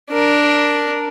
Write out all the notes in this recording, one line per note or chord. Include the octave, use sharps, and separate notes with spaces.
D4 A#4